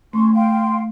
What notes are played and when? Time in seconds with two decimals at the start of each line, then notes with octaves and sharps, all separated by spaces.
0.13 A3 C#4 C6 C#6
0.33 F5 G5 C6